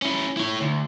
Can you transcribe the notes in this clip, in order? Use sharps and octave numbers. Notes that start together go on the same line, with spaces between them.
C#4 E4
E4 C#5
D2